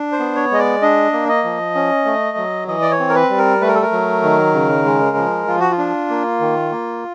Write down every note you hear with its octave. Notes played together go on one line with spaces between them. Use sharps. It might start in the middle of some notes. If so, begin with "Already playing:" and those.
Already playing: D4
C5
B3
C#5
G#3 D#5
D5
D4 D#5
A#3
D#5
F3
C#4
A3
F#3
E3 D#5
D5
C#5
C4
A#4
B4
G3
A#4
A3 B4
A#4
A4
A#4
F#3
D#3
C#3
G#3
F3
F3 F4
F#4
F4
D4
A#3
D#3
A#3